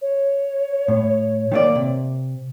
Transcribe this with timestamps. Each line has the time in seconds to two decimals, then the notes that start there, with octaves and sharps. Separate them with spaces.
0.02 C#5
0.88 A2
1.52 D#3 A#3 D5
1.75 C3